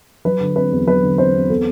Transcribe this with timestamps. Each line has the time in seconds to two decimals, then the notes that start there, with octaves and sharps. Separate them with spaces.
0.25 F#3 B4
0.41 D3
0.56 C4 B4
0.72 E2
0.87 F#3 B4
1.03 D3
1.18 C4 C5
1.34 E2
1.50 B3 A4